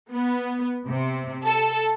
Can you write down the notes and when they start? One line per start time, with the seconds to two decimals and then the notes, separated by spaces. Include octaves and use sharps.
0.11 B3
0.88 C3
1.45 A4